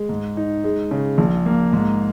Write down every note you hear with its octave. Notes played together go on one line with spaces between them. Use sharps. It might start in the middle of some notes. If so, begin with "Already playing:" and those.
Already playing: G#3
G#2
D#4
G#3
C#3
A#1
A#3
G#2